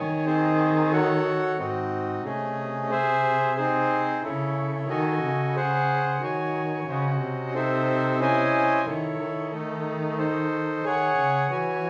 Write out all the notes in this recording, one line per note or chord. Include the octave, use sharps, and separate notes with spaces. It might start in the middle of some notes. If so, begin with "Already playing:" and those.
Already playing: D#3 C#5 G#5
C4 D#4 G#4 C5
F#4 A4 C#5 F#5
G#2 C4 D#4 F#4
C3 A3 C#4 G#4 D#5
G#4 C5 E5
C4 D#4 G#4 C5
C#3 E4 A4 C#5
D#3 F#4 A4 D#5 G#5
C#3
G#4 C5 F#5
D#3 F#4 C#5 G#5
C#3 C#4 F#4 C5 D#5 F#5
C3
C4 D#4 A4 C5 E5
C#4 E4 C5 D#5 G#5
D#3 E4 A4 C#5
D#3
A3 D#4 A4
D#4 A4 C5
D#3 G#4 C#5 F#5
C#3
E3 F#4 C#5 G#5